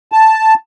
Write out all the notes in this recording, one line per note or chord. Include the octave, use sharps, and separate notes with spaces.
A5